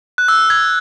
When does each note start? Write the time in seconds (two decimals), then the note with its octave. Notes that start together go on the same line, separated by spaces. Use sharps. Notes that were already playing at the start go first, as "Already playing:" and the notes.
0.18 F#6
0.28 E6
0.50 G#6